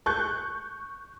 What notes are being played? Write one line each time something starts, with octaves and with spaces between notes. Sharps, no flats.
C#6 F#6 G6